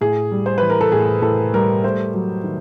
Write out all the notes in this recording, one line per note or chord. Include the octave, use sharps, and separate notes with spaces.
A2 G#4
G3
C5
E3 B4
A#4
A4
A2 G#4
A2 A4
G3 A#4
A3 C5
F#3
D#3